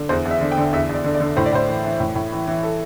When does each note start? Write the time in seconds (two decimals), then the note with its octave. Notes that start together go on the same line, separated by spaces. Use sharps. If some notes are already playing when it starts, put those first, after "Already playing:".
Already playing: D3
0.09 E2 C5
0.25 E2
0.31 E5
0.41 D3
0.52 G5
0.57 D3
0.73 E2 E5
0.89 E2
0.94 D5
1.04 D3
1.15 D5
1.20 D3
1.37 A2 C5
1.46 D5
1.52 A2 C5
1.68 E3
1.84 E3
2.00 A2
2.15 A2
2.32 E3
2.48 E3
2.63 A4